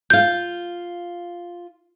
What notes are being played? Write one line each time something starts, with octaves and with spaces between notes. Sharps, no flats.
F4 F5 G6